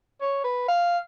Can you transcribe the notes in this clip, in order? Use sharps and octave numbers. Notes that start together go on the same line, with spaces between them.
C#5
B4
F5